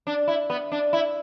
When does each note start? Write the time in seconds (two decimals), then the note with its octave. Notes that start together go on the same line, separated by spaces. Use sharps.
0.07 D4
0.28 E4
0.50 B3
0.72 D4
0.93 E4